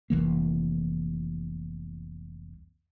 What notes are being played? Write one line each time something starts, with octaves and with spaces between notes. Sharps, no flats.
F1 C2 E3 A#3